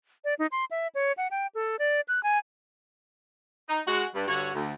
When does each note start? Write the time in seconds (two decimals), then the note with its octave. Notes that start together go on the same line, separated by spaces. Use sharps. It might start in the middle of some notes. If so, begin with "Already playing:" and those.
0.24 D5
0.39 D#4
0.52 C6
0.71 E5
0.95 C#5
1.17 F#5
1.31 G5
1.55 A4
1.79 D5
2.08 F#6
2.23 G#5
3.69 D#4
3.87 G#3 F#4
4.15 G2
4.28 G2 D3 F#4 C#5
4.54 D2